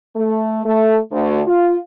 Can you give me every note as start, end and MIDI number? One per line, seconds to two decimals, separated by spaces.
0.16 0.61 57
0.64 0.99 57
1.12 1.41 38
1.47 1.78 65